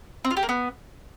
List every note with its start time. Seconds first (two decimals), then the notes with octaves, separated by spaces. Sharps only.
0.25 C4
0.31 F4
0.37 G4
0.43 A#3
0.49 B3